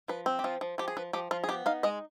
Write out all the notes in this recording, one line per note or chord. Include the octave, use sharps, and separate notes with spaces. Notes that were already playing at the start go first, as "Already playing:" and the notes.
F3 B4
C4
G4
F3 F4
F3
F3 G4
G#4
F3 B4
F3 G4
F3 F4
G#4
B3 G4
D#4 F5
G#3 D#5